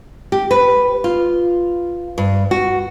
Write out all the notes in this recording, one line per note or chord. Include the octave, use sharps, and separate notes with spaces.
G4
B4
F4
G2
F#4